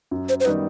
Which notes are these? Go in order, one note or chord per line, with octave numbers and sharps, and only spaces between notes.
F#2
C5
C5
D#3 G3 B3 D#4 B4